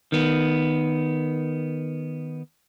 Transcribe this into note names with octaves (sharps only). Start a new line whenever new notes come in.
D#3 B3